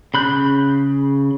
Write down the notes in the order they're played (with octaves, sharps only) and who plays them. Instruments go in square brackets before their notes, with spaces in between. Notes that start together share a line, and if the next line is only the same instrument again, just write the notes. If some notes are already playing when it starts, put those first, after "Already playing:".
[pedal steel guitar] C#3 B5 F#6 G6